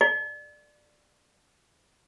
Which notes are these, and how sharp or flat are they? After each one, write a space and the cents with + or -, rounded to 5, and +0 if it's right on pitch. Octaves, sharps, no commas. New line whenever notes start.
D5 +20